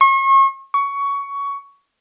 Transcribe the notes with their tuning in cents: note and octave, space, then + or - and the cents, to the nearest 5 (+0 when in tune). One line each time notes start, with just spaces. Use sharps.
C#6 -40
C#6 +15